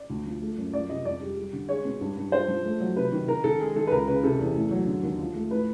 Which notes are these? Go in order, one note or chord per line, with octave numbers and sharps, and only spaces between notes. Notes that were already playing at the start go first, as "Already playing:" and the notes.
Already playing: D5
D2
F3
A3
F#2
F3 D5
C3 D#5
F2 D5
G3
G3
D3
G#3 C#5
B2
G2
G2
F3 C5
F3
A3
F#3
C3 B4
D#3
D#3 A#4
D#3 A4
G#3 G#4
D#3 A4
B4
C#2 A#4
C#3 B4
C3 A4
E2
A2
F#3
D3
D#2
F3
A3
A2 B4